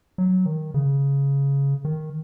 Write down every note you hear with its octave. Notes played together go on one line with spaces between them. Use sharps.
F#3
D#3
C#3
D#3